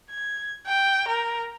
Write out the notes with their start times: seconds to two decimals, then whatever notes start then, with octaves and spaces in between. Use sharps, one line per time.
0.11 G#6
0.66 G5
1.08 A#4